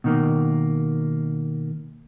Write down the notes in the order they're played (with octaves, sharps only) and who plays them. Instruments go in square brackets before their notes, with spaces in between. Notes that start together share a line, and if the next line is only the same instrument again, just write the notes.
[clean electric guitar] B2 D#3 A#3